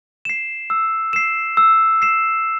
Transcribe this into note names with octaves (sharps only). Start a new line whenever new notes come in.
C7 E7
E6
C7 E7
E6
C7 E7